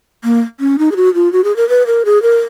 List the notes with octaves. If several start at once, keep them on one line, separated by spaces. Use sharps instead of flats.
A#3
C#4
D#4
G#4
F#4
F4
F#4
G#4
A#4
B4
A#4
G#4
A#4